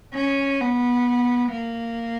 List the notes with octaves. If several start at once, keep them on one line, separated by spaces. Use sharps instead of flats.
C#4
B3
A#3